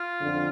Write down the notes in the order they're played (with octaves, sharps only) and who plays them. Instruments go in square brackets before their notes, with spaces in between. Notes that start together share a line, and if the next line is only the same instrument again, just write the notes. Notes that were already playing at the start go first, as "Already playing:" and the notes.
Already playing: [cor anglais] F4
[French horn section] F2 D3